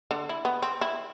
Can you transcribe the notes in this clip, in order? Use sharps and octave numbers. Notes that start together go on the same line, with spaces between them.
D3
E4
B3
C4
E4